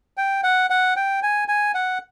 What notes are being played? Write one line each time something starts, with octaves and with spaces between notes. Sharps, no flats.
G5
F#5
F#5
G5
G#5
G#5
F#5